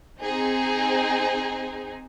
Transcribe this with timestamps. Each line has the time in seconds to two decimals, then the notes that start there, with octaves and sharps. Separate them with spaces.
0.20 C4 D#4 G#4